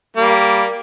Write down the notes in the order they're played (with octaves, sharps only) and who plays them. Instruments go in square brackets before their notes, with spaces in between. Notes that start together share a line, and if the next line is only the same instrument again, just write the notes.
[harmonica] G3 A#3